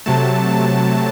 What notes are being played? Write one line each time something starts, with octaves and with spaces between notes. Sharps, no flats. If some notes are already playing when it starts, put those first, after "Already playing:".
C3 F#3 A3 A5